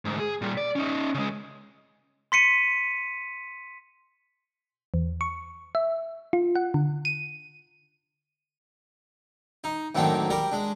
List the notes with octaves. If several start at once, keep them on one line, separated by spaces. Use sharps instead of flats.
D2 G#2
G#4
A#2 G3
D5
C#4 D#4
C#3 G#3
C6 B6 C#7 D#7
E2
C#6
E5
F4
F#5
D3
D#7
D#4
F#2 A2 D#3 A#3 C4 D4
G3 A#4 D5
G#3 D4